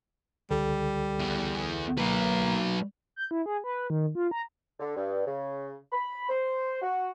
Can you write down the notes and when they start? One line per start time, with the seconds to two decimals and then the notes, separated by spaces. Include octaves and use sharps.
0.51 C#2 D3 G3 A4
1.20 E2
1.98 F#3 A#3 B4
3.16 G6
3.31 E4
3.46 G#4
3.64 B4
3.90 D#3
4.15 F4
4.31 A#5
4.80 D3
4.96 G2
5.26 C#3
5.92 B5
6.29 C5
6.81 F#4